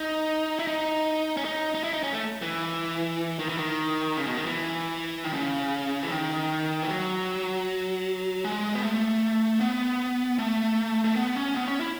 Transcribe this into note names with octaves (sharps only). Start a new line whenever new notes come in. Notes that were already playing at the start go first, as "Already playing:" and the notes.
Already playing: D#4
E4
D#4
C#4
D#4
D#4
E4
D#4
C#4
A3
E3
D#3
E3
D#3
C#3
B2
D#3
E3
D#3
C#3
E3
D#3
E3
F#3
G#3
B3
A3
B3
A3
A3
B3
C#4
B3
C#4
E4